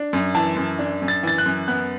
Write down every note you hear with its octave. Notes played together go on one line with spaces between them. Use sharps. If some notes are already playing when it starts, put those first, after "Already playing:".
Already playing: D4
F#2
E3 A5
F#2
D4
F#2
A6
E3 A6
F#6
F#2
B3 F#6